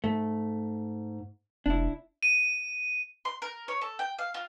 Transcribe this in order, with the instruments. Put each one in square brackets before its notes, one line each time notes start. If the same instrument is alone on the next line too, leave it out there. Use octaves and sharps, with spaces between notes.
[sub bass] G#2 [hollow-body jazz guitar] A3
[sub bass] F1 [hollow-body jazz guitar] D4 E4
[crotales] D#7
[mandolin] C6
A#4
C#5
A4
G5
F5
F4